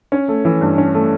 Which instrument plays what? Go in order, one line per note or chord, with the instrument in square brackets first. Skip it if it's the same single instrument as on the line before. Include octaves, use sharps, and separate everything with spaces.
[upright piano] C#4
A3
E3
G2
C#4
A3